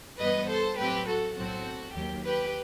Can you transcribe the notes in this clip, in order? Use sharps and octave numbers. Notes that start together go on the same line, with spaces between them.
G2 E3 B3 B4 D#5
A4 C5
A2 F#3 A3 C4 G4 B4
F#4 A4
B1 A2 F#3 C4 F#4 A4
D#2 D#3 F#3 G4
G4 B4